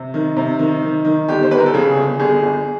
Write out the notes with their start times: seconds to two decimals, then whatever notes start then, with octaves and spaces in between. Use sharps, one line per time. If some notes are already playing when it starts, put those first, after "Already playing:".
Already playing: C3
0.14 D#3
0.37 C3
0.59 D#3
0.83 D#3
1.05 D#3
1.28 G1 G4
1.43 C5
1.51 G1 B4
1.58 A#4
1.66 A4
1.74 C#3 G#4
1.97 G1
2.20 G1 G#4
2.43 G1